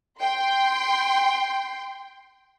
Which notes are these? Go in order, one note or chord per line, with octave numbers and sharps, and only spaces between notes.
G5 C6